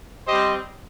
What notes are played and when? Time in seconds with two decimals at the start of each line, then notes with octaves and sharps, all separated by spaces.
0.27 G3 C4 G4 C5 D#5